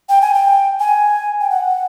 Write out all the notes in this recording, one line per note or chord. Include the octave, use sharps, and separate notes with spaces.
G5
G#5
G5
G#5
G5
F#5